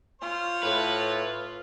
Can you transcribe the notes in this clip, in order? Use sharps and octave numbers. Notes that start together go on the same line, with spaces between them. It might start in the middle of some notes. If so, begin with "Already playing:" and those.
F4 C5 C#5 C6
A2 B4